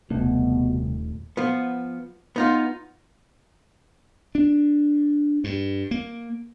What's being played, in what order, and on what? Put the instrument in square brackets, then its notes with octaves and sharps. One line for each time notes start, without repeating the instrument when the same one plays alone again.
[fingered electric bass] D#1 A3 [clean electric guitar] C2 [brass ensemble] B2
[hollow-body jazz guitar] F3 B3
B3 D#4 F4
[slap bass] D4
G2
A#3